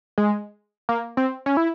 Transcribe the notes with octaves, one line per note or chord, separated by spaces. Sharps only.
G#3
A#3
C4
C#4
E4